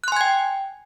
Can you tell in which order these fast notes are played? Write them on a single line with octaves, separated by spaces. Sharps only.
F#6 C6 G#5 G#6 G5